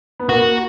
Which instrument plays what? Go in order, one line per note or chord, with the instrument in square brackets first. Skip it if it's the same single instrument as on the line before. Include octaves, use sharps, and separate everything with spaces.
[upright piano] B3
[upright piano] A#3 [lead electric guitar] F#4